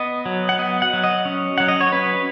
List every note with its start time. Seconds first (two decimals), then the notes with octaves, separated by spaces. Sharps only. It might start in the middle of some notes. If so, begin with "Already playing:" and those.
Already playing: B3 D#5
0.26 F#3
0.49 F#5
0.59 B3 D#5
0.82 F#5
0.93 F#3
1.04 D#5
1.25 C#4
1.58 F#3 F#5
1.68 D#5
1.81 C#5
1.92 C#4 B4